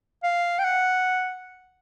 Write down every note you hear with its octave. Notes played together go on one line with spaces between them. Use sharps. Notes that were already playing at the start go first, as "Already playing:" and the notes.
F5
G5
F#5